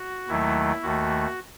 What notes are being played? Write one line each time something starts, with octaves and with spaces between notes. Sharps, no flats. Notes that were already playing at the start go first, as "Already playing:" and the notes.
Already playing: F#4
D#2 D#3 F#3 A3 E4
D#2 D#3 A3 F#4